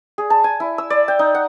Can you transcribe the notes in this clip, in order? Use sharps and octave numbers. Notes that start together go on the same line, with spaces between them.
G#4
A5
G#5
E4
E6
D5
G5
D#4
F#5